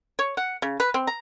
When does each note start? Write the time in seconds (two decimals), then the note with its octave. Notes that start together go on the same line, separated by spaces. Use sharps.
0.19 C#5
0.37 F#5
0.62 C#3
0.80 B4
0.94 C4
1.07 A#5